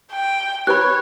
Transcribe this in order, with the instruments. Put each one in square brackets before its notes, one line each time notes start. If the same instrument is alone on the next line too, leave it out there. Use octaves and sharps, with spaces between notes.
[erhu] G5
[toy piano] G4 B4 B5 [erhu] C#5 [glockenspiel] F#6